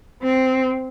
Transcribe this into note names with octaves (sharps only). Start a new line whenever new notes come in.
C4